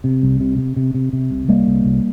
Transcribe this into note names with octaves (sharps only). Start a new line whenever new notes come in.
C3
C2
C3
C3
C3
C3
C3
C2
C2 G3 A#3
C2
C2